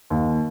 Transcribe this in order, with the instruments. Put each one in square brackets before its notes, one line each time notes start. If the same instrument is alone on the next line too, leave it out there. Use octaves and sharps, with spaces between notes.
[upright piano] D#2